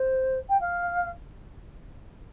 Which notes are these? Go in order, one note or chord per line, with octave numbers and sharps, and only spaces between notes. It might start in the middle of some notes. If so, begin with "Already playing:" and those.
Already playing: C5
G5
F5